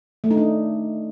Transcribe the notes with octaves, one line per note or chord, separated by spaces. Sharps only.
A3
D#4
D4